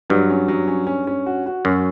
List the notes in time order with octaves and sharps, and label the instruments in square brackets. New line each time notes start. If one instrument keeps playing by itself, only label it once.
[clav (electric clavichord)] G2 [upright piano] F#3
[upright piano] C#4
F#3
C#4
C#4
C#4
F#4
F#4
[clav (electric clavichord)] F#2 [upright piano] C#4